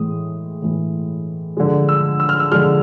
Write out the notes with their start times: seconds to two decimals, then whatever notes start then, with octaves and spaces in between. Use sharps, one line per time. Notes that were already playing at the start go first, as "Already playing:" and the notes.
Already playing: A2 E3 G#3 D#6
0.62 A2 E3 G#3
1.57 D3 F3 G#3
1.89 E6
2.20 E6
2.29 F6
2.40 E6
2.51 D3 F3 G#3 F6